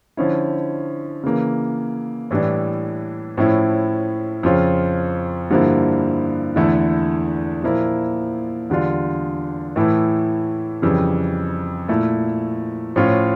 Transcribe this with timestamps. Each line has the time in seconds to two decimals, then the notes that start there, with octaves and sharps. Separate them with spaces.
0.17 D3 F3 C#4 E4
1.24 C#3 E3 A#3
2.31 A2 E3 G3 D4
3.37 A2 F3 C#4 E4
4.43 F2 C#3 F3 C#4 F4
5.50 G2 D3 F3 A#3 E4
6.56 E2 D3 A3 E4
7.62 A#2 F3 A#3 E4
8.70 E2 D3 G3 D4 F4
9.76 A2 E3 A3 E4
10.82 F2 C#3 E3 G3
11.88 A#2 A3 E4
12.96 A2 F3 C#4 F4